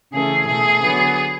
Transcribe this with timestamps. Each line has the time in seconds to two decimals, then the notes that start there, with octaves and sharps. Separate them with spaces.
0.13 C#3 E3 A3 G#4
0.47 B2 A3 G#4
0.82 D3 F#3 B3